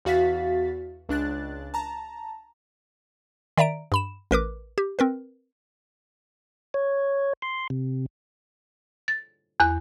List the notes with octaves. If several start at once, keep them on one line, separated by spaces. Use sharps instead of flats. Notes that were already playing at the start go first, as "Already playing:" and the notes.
E2 F#4 F5 A6 B6
C#2 D4 F#6 A6
A5 A#5
D#3 D5 E5 A#5 D7
G2 B5 E7
A1 A#4 B4 D6
G4
C4 A#4 B4
C#5
C6
C3
A6
E2 F#6